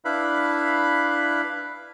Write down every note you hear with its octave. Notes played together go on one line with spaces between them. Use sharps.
D4 E4 B4 E5 F5 B5